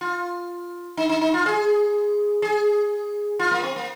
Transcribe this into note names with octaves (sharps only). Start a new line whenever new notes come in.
F4
D#4
D#4
D#4
F4
G#4
G#4
F4
A#3
C4
A#3